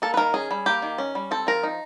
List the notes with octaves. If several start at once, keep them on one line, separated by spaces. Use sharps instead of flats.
A#3 A4
B4
D#3 A#4
C#4 G#4
G3
A#3 G4
D#3
C#4
G3
C4 A4
F3 A#4
D#4